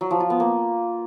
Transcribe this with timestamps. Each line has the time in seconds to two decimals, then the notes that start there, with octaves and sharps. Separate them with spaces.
0.01 F#3
0.11 F3
0.20 F4
0.30 B3
0.40 A#3